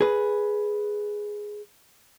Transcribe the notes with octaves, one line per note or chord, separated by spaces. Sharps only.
G#4 B4